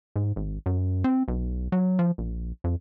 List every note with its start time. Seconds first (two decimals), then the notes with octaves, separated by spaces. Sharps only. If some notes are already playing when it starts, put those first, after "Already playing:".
0.16 G#2
0.36 G#1
0.66 F#2
1.04 C4
1.28 B1
1.72 F#3
1.99 F3
2.18 A#1
2.64 F2